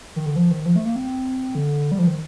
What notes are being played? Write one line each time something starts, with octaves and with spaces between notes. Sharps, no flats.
D#3
D3
F3
D#3
F3
A3
A#3
C4
D3
G3
F3
D#3